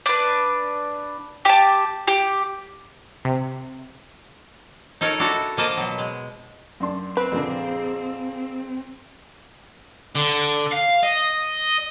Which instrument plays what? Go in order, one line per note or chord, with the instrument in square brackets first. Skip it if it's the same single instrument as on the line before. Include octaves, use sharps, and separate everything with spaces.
[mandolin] D4 B4
G4 A5
G4
[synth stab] C3
[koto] D#4 A4 A#4 C#5
D4 E4 F#4 A4
F3 A#3 D#5 A5
B2 F#3
G#3
[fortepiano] F#2 D4 C6
[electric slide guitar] C4 [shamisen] B4
[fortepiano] F2 A#2 D3 [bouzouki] A#3 G#4
[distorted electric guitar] D3
F5
D#5